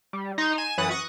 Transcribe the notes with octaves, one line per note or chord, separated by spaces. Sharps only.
G3
D#4 A#5 C6
G#5 D#7 E7
F#2 E3 B4 F#5 D#6 A6
C#6 D#6 F#6 A#6